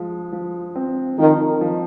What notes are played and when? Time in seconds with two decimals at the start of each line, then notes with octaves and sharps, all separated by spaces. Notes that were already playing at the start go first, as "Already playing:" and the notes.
Already playing: F3 G#3
0.32 F3
0.76 C4
1.18 D#3 F3
1.61 F3